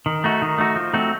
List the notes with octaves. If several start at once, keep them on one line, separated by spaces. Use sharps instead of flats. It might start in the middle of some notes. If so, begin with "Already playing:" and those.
D#3
A3 D#4 F#4
D#3
A3 D#4 F#4
F3
A3 C4 D#4 F#4